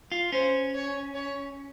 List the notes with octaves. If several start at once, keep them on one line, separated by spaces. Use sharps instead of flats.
F4
C#4 C5
C#5
C#5